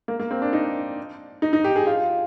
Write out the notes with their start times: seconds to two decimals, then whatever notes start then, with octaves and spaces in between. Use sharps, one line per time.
0.08 A#3
0.20 A#3
0.31 C4
0.42 D4
0.53 D#4
1.42 D#4
1.53 D#4
1.64 G4
1.76 G#4
1.87 F4